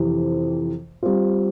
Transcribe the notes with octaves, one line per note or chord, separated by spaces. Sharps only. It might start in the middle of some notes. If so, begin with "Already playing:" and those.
Already playing: F2 C3 E3
G3 C4 F4